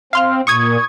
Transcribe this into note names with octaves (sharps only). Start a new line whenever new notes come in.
C4 F5 C6 F6
A#2 C#6 D#6 G#6